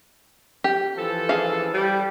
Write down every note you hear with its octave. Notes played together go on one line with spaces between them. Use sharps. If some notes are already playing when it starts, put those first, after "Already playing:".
G4
E3 F3 A4
G#4 F5
G3